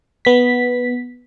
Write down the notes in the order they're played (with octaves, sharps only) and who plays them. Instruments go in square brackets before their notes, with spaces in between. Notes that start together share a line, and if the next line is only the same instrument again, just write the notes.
[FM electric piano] B3 B6